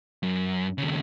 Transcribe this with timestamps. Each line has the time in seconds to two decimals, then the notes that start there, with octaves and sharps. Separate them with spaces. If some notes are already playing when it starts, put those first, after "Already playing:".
0.23 F#2
0.78 D#2 C#3